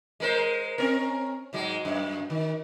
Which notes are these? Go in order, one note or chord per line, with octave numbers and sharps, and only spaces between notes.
G#3 A#4 C5
C4 C#4 A#4
G#2 F#3 G#3
F#2
D#3